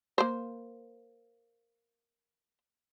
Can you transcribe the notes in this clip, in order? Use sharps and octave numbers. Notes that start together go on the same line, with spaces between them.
A#3 C5